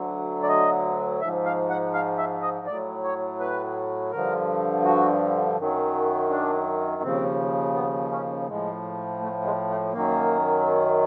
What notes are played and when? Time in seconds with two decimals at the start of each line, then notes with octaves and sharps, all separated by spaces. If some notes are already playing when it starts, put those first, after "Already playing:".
Already playing: D2 D3 F#3
0.43 D5
0.49 D#5
1.21 G#2 E5
1.24 F3
1.45 F5
1.70 F#5
1.94 F5
2.18 E5
2.42 D#5
2.66 A2 F#3 D5
3.03 C#5
3.40 B4
4.12 G2 D3 F3 A#4
4.85 F#4
5.57 F#2 D#3 F#3
6.30 D4
7.02 D#2 C#3 F3 C4
7.75 B3
8.11 C#4
8.48 A2 F3 G#3
9.21 A3
9.44 G#3
9.69 A3
9.93 F#2 D#3 F#3 A#3